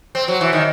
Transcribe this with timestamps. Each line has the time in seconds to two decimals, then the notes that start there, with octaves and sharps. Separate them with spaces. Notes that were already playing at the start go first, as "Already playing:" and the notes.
0.15 C4
0.28 F#3
0.41 E3
0.53 D#3